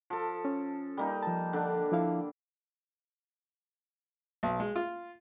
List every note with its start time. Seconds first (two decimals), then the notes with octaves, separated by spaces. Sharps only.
0.10 F3 A4
0.45 C#4
0.97 G3 A#3 D#4
1.23 F3 A5
1.53 D3 D4
1.92 F3 E4 F5
4.43 B1
4.60 G#3
4.76 F4